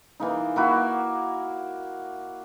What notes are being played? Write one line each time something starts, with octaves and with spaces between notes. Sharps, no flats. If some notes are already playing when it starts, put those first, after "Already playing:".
E3 A#3 D#4
A#3 E4 F#4